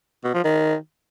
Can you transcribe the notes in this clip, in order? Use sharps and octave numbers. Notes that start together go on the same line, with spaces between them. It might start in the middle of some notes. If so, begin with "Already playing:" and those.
B2
F3
D#3